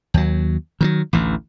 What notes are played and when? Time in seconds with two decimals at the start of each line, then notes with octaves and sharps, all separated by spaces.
0.14 D#2 F#3
0.81 D#3 E3 F#3
1.13 A1 D2 E3